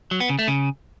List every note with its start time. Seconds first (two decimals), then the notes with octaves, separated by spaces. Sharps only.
0.11 F#3
0.20 B3
0.30 C#3
0.39 A3
0.48 C#3